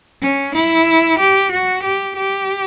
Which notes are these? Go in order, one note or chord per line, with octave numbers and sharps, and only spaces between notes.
C#4
E4
G4
F#4
G4
G4